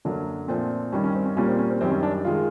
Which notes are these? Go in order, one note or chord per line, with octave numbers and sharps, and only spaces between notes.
F#2 D3 F#3 A#3 D4
A#2 F3 A3 C4
G2 D#3 G3 C#4
C#4
C4
C#4
A#2 G3 A#3 C#4
C4
C#4
C4
F#2 D#3 G3 C4
C#4
D4
D#3 G#3 F4